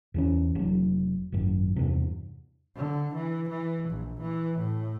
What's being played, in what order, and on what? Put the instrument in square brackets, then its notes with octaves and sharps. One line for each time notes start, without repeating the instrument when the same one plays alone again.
[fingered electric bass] E2 E3 C#4
F1 F#3
G#1 F#2
E2 G2 C3
[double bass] D3
E3
E3
A#1
E3
A2